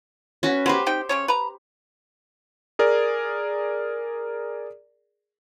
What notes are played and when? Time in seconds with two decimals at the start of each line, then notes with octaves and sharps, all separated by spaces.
0.43 C#4 F#4 B4
0.66 F#3 G4 B4 C5
0.86 C4 D#4 G5
1.09 C#3 C#4 C#5
1.28 B4 A#5
2.79 G#4 A#4 D5